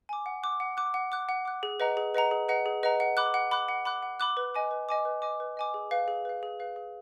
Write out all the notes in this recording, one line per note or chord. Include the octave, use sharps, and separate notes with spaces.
G#5 D6
F#5
D6 F#6
F#5
D6 F#6
F#5
D6 F#6
F#5
D6 F#6
G#4
B4 D#5 F#5 A#5
G#4
B4 D#5 F#5 A#5
G#4
B4 D#5 F#5 A#5
G#4
B4 D#5 F#5 A#5
F#5
B5 D6 F#6
F#5
B5 D6 F#6
F#5
B5 D6 F#6
F#5
B5 D6 F#6
B4
D#5 G#5 D6
B4
D#5 G#5 D6
B4
D#5 G#5 D6
B4
D#5 G#5 D6
G#4
B4 F5
G#4
B4 F5
G#4
B4 F5
G#4